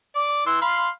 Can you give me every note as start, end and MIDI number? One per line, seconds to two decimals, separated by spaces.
0.15 0.43 74
0.15 0.43 86
0.46 0.57 52
0.46 0.57 84
0.46 0.57 88
0.62 0.89 77
0.62 0.89 83
0.62 0.89 84